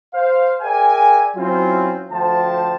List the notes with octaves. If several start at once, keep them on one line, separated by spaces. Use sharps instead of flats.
C5 F5
G#4 A#4 D5 E5 G5 G#5
F#3 C4 C#4 E4 F4
D2 F3 C5 G5 A5